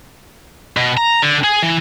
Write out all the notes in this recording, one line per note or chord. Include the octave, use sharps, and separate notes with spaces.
B2
A#5
D3
G#4
E3